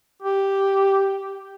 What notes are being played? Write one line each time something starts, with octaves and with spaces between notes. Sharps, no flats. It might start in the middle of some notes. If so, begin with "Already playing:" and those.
G4